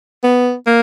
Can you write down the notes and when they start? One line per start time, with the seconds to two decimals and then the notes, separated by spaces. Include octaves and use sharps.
0.24 B3
0.67 A#3